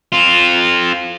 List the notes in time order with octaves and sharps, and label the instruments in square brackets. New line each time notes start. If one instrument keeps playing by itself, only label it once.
[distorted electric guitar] C4 F4